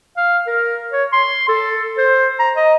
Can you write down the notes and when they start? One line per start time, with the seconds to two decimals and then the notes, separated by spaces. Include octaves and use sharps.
0.17 F5
0.47 A#4
0.92 C#5
1.13 C6
1.49 A4
1.98 C5
2.40 A#5
2.57 D#5